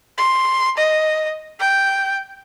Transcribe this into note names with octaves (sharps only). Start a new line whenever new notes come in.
C6
D#5
G5